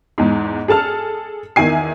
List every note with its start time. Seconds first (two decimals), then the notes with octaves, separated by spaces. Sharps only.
0.18 E2 G#2
0.68 G#4 A4 A5 F6
1.56 E2 D#3 E5 G#5 C7